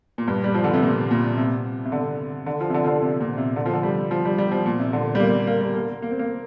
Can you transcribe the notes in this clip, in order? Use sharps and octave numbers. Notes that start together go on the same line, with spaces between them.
A#2
G2
G3
F3
D3
C3
A#2
A#2
C3
C3
D3
D3
F3
C3
D3
F3
D3
C3
A#2
C3
D3
F3
D3
G3
F3
G3
G3
F3
A#2
C3
D3
G3
A#3
A#3
G3
A#3
A#3
C4
A#3